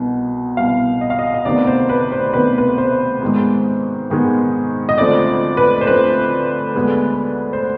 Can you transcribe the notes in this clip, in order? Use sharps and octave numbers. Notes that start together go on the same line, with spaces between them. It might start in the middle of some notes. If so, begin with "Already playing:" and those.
Already playing: C2 B2 B3
C2 B2 B3 F5
D#5
F5
D#5
D#5
D2 C3 D#3 B3 D5
C5
B4
C5
D2 C3 D#3 B3 B4
B4
C5
G#2 D#3 G#3 B3
G#2 D#3 G#3 B3
D#5
D2 D3 F3 C4 D5
B4
C5
D2 D3 F3 C4 B4
D2 D3 G#3 B3
C5